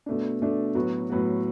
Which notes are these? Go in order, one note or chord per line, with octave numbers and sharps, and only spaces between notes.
B2 A3 D4
B2 A3 D4
A2 F#3 B3 F#4
A2 F#3 B3 F#4